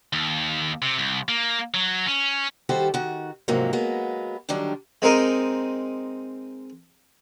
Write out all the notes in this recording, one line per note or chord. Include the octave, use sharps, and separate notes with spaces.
D#2
C3
C2
A#3
F#3
C#4
D#3 G3 F#4 G4 A4 C5
D#3 F#4
G#2 C3 F3 F#3 A#3
F#3 G#3 A#3 B3
D3 D#3 F#3 G3 D4 A4
G#3 C4 D#4 A#4 D#5